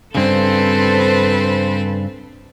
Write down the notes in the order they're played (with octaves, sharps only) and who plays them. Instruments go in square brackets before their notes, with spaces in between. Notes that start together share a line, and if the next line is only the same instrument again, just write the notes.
[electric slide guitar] G2 C#3 [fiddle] C4 C5 [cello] A4 B4